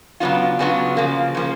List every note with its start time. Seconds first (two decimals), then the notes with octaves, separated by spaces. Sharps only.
0.20 C#3 F#3 B3 D4 F4
0.59 C#3 F#3 B3 D4 F4
0.97 C#3 F3 A#3
1.35 C#3 F3 A#3